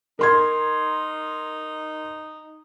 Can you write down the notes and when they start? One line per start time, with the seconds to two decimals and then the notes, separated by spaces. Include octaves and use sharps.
0.19 D#4 A#4 C6 G#6